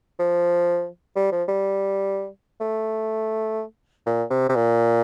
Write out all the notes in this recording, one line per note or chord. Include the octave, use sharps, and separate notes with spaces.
F3
G3
F3
G3
A3
A#2
C3
C3
A#2